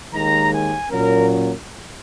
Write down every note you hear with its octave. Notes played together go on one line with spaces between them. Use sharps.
D#2 D#3 G#3 A#5
G#5
A#2 F#3 A#3 C#4 A#4